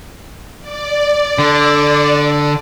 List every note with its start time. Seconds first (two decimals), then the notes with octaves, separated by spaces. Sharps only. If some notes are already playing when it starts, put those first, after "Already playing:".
0.61 D5
1.39 D3